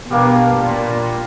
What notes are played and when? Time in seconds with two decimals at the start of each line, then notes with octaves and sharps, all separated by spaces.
0.10 B2 G3 A#3 D4
0.57 A#2